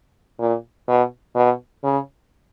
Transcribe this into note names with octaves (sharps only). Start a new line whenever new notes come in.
A#2
B2
B2
C#3